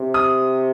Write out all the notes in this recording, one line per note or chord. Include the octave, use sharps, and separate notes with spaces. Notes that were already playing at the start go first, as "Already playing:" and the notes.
Already playing: C3
D#6